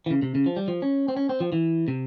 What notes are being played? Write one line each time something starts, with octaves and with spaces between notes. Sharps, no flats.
E3
C#3
C3
C#3
F3
G3
F3
C#4
C4
C#4
C4
F3
E3
C3